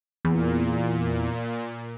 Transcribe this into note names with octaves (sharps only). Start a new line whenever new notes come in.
E2 A#2